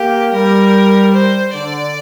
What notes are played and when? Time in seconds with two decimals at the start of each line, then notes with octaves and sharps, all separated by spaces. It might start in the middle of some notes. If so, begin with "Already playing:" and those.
Already playing: A#3 G4
0.32 G3 A#4
1.13 C5
1.54 D3 D5